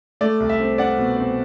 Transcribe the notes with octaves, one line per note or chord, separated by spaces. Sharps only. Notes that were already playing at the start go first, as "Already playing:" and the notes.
A3 D5
C2
E5
C4
C4 D5 F#5
B2
C4